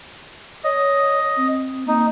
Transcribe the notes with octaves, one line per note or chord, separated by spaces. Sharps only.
C#5 D#5
C4
A#3 D#4